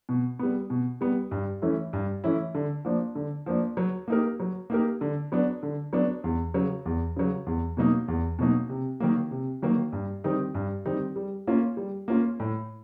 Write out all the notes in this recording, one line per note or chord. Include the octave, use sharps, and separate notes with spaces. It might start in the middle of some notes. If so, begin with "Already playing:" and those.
B2
G3 B3
B2
G3 B3
G2
E3 A3 C#4 E4
G2
E3 A3 C#4 E4
D3
F3 A#3 D4
D3
F3 A#3 D4
F#3
A#3 D#4 G4 A#4
F#3
A#3 D#4 G4 A#4
D3
F#3 B3 D4
D3
F#3 B3 D4
E2
C#3 F#3
E2
C#3 F#3
E2
B2 F#3 A#3 D#4
E2
B2 F#3 A#3 D#4
C3
D#3 F#3 A#3
C3
D#3 F#3 A#3
G2
D#3 G3 C4 D#4
G2
D#3 G3 C4 D#4
G3
A#3 C#4 F4
G3
A#3 C#4 F4
A2